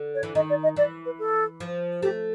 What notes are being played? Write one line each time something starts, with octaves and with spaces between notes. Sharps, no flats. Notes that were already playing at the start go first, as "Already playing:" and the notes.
Already playing: D3
C#5
E3
D#3 D#5
D5
D#5
E3 D5
B4
A4
F3
A3 G4